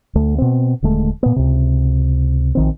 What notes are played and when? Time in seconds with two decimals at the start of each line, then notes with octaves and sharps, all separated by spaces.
0.15 D2 A3
0.38 B2 C4
0.82 D#1 D3 G#3 A3
1.23 A#2 B3
1.36 C#2 C3
2.55 A#1 D#3 C4